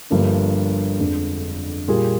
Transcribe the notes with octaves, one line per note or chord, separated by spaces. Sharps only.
G1 G2 F3 A#3 D4
G1 F2 D3 G#3
A#2 G3 A#3 F4 G#4